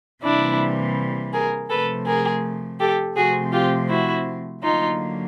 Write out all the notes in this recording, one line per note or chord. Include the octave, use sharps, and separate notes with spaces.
C3 E3 G3 A#3 D4 E4
G#4 A#4
C3 F3 A3 A4 B4
G#4 A#4
G4 A4
C3 F3 A3 C4 F#4 G#4
F4 G4
E4 F#4
D3 F#3 A#3 D#4 F4